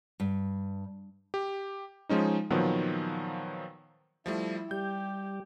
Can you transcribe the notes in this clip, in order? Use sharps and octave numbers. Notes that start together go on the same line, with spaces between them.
G2
G4
F3 G#3 C#4 D#4
A#2 D#3 F3 F#3 B3
F3 G3 A3 E4
G3 G4 G6